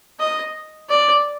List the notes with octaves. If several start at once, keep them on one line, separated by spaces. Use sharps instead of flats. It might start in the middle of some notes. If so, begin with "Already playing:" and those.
D#5
D5